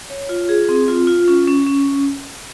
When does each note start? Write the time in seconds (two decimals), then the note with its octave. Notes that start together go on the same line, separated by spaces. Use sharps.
0.10 C#5
0.29 F4
0.49 G#4
0.69 C4
0.88 F4
1.07 F4
1.28 C#4
1.47 C#4
1.66 C#4